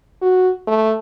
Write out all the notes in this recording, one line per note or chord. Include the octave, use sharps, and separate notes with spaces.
F#4
A3